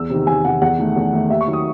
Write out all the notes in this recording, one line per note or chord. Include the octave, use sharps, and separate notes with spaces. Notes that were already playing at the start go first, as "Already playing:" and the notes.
Already playing: E2 E6
C3 D#3
E2 G#5
C3 D#3 F#5
E2 F#5
D#3 A3
E2
D#3 A3
D#2 E5
C#6
D#3 F#3
D#6